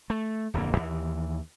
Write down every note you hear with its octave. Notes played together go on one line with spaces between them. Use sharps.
A3
D1 F2 D3 A#3
D#2 E3